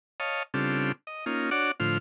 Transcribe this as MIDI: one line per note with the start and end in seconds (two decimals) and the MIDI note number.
0.20 0.43 73
0.20 0.43 75
0.20 0.43 77
0.20 0.43 81
0.54 0.92 49
0.54 0.92 55
0.54 0.92 60
0.54 0.92 62
0.54 0.92 65
0.54 0.92 69
1.07 1.25 75
1.26 1.50 58
1.26 1.50 61
1.26 1.50 63
1.26 1.50 65
1.51 1.71 62
1.51 1.71 66
1.51 1.71 73
1.51 1.71 74
1.51 1.71 78
1.51 1.71 86
1.80 1.98 45
1.80 1.98 50
1.80 1.98 53
1.80 1.98 65
1.80 1.98 72
1.80 1.98 89